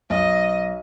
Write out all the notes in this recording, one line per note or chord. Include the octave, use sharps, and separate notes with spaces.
B1 D#5